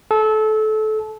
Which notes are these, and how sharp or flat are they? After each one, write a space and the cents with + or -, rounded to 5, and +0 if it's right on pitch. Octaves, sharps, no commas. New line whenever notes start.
A4 -25